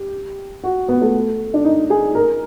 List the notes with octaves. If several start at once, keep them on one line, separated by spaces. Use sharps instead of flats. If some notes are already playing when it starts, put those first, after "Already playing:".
Already playing: G4
F#4
B3
A3
D4
D#4
G#4
A#4